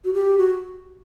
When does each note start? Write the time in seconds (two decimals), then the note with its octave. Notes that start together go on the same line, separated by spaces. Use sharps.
0.05 F#4
0.14 G4
0.38 F#4